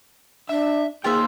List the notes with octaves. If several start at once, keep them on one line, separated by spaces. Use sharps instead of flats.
D4 E5
A#3 D#4 F4 G#4 C5 E5 G5